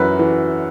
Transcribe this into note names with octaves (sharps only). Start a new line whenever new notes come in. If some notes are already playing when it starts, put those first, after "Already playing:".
Already playing: F#2 E3 F#4 B4
E3